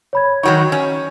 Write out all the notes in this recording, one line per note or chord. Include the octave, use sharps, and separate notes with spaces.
C#5 B5 G#6
D#3 F#3 D#4 C#6
C#4